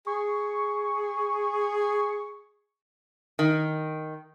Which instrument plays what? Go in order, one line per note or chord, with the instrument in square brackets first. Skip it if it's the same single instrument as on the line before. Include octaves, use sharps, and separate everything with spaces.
[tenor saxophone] G#4 [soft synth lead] C#6
[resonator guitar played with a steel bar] D#3